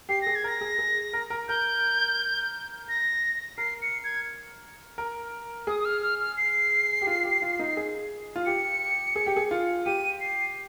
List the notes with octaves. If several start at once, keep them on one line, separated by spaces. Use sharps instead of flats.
G4 C7
G#4 A#6
G#6
A#4 A#6
G#4
G#4
A#4
A#4
A#4 G6
A#6
A#4 C7
C#7
G#6
A#4
G#4 D#6
D#6
F6
F6
F6
C7
G4
F4
G4
F4
D#4
G#4
F4
G4 C#7
G#4
G4
G#4
F4
G4 D#7
C7